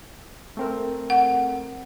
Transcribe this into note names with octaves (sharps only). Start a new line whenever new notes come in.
A3 C4 A#4
F#5